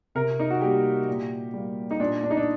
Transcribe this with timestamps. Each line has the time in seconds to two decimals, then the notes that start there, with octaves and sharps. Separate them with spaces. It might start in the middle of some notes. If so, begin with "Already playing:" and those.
0.15 C3 A#4
0.40 D#4
0.50 F#4
0.61 G3 A#3 G4
1.08 A#2
1.53 G3 A#3
1.91 D#4
2.00 A#2 D4
2.23 D4
2.30 D#4
2.37 D4